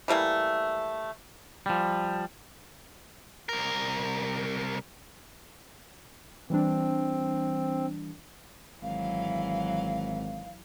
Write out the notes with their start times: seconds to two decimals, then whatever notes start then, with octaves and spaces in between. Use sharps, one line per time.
0.08 E3 G3 A3 A#3
1.66 F3 G3
3.49 C2 A#4
6.50 E3 G3 C4 D4
8.82 G#1 E3 F#3 F5